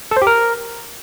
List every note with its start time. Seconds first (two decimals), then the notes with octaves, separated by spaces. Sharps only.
0.11 A4
0.17 C5
0.22 G4
0.27 A#4